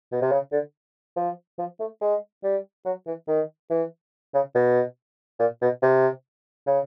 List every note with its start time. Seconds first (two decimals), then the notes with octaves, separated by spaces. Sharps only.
0.12 B2
0.22 C3
0.32 C#3
0.52 D3
1.16 F3
1.58 F3
1.80 A3
2.01 G#3
2.44 G3
2.85 F#3
3.07 E3
3.28 D#3
3.70 E3
4.34 C#3
4.55 B2
5.39 A#2
5.62 B2
5.82 C3
6.66 C#3